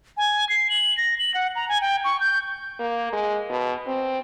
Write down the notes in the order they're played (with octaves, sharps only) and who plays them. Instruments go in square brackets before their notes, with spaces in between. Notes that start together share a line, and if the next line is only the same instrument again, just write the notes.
[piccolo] G#5
C7
F#7
A#6
F#7
F#5
A#5
G#5
G5
C#6
G6
[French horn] A#3
G#3
B2
C4